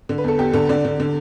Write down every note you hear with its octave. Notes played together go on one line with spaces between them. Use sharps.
D3
B4
E2 A4
E2 G4
D3 A4
D3 D5
D3
D3